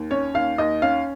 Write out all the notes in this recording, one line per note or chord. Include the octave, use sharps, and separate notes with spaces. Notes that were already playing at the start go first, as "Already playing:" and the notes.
Already playing: D#2
C#4 C#5
D#2 F5
D#2 D#5
C#4 F5